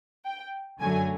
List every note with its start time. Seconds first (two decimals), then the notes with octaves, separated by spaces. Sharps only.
0.26 G5
0.80 F#2 D3 F#3 A3 G#5